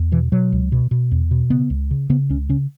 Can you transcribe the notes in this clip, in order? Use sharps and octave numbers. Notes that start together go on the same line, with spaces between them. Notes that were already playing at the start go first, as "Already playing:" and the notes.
Already playing: E2
B2 E3
B2 F#3
C#2
B2
B2
E2
B2
C#3 B3
C#2
C#3
C#3 B3
C#2 C#4
C#3 C#4